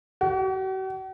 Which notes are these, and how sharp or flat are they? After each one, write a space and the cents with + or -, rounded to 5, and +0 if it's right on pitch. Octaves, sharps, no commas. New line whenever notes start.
F#4 +45